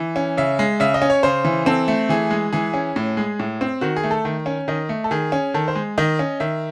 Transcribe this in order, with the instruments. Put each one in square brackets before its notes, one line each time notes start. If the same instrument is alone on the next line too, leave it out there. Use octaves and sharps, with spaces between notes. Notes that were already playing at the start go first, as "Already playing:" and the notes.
Already playing: [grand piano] E3
C#4
C#3 E5
G#3
C#3 E5
D#5
C#4
C#5
C#3 C5
E3
C4 A4
A3
E3 G#4
G#3
E3 G#4
C#4
A2
G#3
A2
C4
D#3 F#4
G#4
A3
A4
D#3
C#4
D#3 D#5
A3
A4
D#3 G#4
C#4
D#3 A4
C5
G#3
D#3 D#5
C#4
D#3 E5